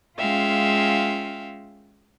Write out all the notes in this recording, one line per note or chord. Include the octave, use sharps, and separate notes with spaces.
G#3 C#4 F4 E5 F5 G5